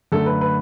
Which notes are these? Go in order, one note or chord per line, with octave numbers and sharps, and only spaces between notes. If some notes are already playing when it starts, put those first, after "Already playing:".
F#2 D3 A3 A4
B4
B4